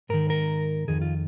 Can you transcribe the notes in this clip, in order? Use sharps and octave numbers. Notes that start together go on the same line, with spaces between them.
G#2 D#3 A#4
A#4
F2 D#3 G#4
F4